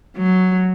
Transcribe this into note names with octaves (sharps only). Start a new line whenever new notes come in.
F#3